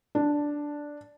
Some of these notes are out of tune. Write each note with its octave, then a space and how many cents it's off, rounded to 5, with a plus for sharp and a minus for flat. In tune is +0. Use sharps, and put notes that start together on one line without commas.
D4 +0